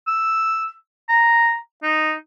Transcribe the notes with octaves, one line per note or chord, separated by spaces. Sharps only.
E6
A#5
D#4